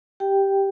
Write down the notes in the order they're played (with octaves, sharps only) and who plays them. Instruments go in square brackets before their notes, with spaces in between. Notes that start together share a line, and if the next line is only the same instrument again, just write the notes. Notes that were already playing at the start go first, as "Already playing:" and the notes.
[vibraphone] G4 G5